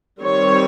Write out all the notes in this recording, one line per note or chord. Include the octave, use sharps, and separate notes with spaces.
D#3 G3 C4 C#5